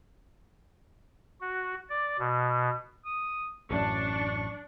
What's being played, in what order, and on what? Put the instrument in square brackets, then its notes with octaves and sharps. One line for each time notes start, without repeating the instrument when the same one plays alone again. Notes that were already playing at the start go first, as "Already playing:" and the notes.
[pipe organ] F#4
D5
B2
[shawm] D#6
[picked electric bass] A1 F#2 [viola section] D4 [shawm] C#6